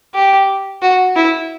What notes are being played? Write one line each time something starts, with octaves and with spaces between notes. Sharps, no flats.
G4
F#4
E4